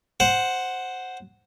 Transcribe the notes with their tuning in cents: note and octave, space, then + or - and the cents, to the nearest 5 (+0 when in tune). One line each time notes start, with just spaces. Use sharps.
C5 +0 F#5 +0